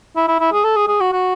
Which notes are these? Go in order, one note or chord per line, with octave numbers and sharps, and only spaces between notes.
E4
E4
E4
G#4
A4
G#4
G#4
F#4
F#4